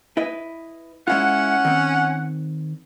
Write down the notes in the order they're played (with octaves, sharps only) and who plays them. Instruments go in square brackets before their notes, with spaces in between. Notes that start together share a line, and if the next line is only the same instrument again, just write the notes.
[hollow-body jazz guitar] E4 B4 D#5
[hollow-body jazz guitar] G#3 E4 F4 [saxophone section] C#4 F#5
[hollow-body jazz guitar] D#3 C4